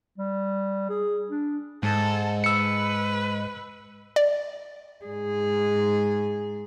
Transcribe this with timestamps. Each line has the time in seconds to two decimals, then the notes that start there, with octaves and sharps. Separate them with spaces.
0.18 G3
0.89 G#4
1.30 D4
1.83 G#2 G#3 A4
2.44 B4 E6 C#7
4.16 D5
5.05 G#2 G#4